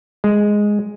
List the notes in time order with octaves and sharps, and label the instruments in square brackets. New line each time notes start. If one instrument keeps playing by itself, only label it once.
[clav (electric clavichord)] G#3